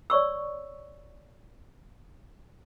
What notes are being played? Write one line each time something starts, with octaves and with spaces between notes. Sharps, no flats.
C#5 D5 C#6 E6